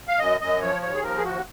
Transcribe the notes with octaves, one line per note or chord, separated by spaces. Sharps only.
F5
F#2 D#5
F#2 D#5
F3 C#5
D#2 C#5
G#4
F3 A#4
G#4
D#2 F#4